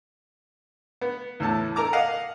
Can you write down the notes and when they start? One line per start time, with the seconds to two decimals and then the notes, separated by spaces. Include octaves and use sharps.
1.01 B3
1.40 E2 A2 A5
1.76 A4 A#4 A#5 D6
1.93 D#5 F5 F#5